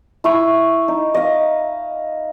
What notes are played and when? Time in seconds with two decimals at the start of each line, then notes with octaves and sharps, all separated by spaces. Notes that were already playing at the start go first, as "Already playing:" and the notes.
0.24 E4 C#6 D#6
0.88 D#4
1.14 D#5 F5